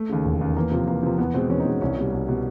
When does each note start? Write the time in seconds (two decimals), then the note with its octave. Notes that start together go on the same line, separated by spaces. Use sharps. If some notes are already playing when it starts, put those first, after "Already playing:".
Already playing: A3
0.09 D#2 C#3
0.25 E1
0.41 D#2 C#3
0.56 E2 A#3
0.71 C3 F3
0.87 E2 A#3
1.03 C3 F3
1.18 E2 B3
1.34 B2 G#3 C4
1.49 E2 C#4
1.60 D#4
1.65 B2 G#3
1.81 C2 C#4
1.97 B2 G3
2.12 C2
2.28 B2 G3